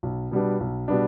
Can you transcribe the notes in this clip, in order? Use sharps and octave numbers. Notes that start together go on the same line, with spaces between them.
B1
B2 G3 B3 D4
B1
B2 G3 B3 D4